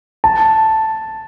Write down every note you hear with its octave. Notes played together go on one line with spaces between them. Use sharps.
A5